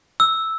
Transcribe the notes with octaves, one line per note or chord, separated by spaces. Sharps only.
E6